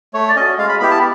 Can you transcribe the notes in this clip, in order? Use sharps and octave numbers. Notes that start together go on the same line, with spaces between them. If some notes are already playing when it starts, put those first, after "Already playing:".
A3 C#5
D5
C#4 F#4 D#5
G#3 F5
B5
B3 E4 G4 B5
A5